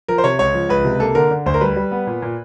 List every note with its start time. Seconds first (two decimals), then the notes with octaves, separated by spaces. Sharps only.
0.08 F3 A#4
0.18 C5
0.24 C3 C#5
0.39 C#2 C#5
0.54 F3
0.69 C#2 B4
0.85 C3
1.00 A#3 A4
1.15 D3 A#4
1.31 D3
1.46 D2 C5
1.54 A#4
1.61 G3 B4
1.76 G3
1.92 B3
2.07 A#2
2.22 A#2